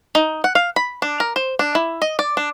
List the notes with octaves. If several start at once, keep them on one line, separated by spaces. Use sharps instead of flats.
D#4
F#5
F5
B5
D4
A#4
C5
D4
E4
D#5
D5
D4